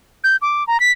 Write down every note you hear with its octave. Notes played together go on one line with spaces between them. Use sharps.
G6
D6
A#5
B6